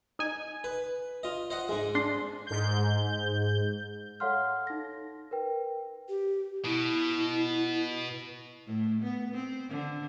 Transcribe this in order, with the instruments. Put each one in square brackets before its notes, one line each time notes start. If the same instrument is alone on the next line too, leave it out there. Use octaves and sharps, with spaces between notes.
[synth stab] D#4 G#5
[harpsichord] B4
F4 D#5
C5 D#5 F#5
G#2 G#3
[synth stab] D4 C6
[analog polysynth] G#2 G6
[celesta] A4 C#5 F5 F#5 C6 F6
D#4 A#6
A#4 B4 G5
[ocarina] G4
[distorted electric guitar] B2 [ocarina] E4
[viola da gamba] A2
B3
C4
D3